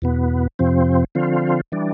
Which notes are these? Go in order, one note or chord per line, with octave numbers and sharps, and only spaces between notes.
E2 B2 B3
F2 C3 F3 C4
D3 F3 C4 F4
E3 G3 D4